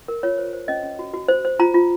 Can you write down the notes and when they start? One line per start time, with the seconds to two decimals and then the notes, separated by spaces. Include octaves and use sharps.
0.08 A#4
0.23 F4 C#5
0.38 C5
0.53 C5
0.68 C#4 D#5
0.83 C#4
0.99 F#4
1.14 F#4
1.28 C5
1.45 C5
1.59 F4 A#5
1.74 F4